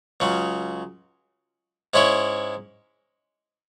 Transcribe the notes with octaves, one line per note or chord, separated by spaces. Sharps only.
C#2 C#3 F#3
G#2 G#3 C#4 E4 C#5